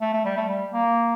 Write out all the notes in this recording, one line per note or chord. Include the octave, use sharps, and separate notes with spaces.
A3
A3
G3
A3
G3
A#3